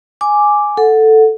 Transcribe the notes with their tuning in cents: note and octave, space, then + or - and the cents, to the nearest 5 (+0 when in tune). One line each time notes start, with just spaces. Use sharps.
G#5 +0 D6 +0
A4 +0 F#5 -10